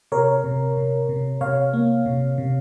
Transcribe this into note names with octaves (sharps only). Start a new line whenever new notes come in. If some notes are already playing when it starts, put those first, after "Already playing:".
C3 A#4 C#5
C3
C3
C3
C3 C#5 F5
A#3
C3
C3